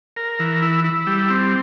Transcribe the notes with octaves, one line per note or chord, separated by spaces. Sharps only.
A#4
E3
E4
E4
G3
C4